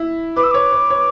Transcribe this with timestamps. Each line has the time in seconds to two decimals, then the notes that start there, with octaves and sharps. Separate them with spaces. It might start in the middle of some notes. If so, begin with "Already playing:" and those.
Already playing: E4
0.36 B4 D6
0.43 E6
0.51 C#5 D6
0.72 C#5
0.90 C#5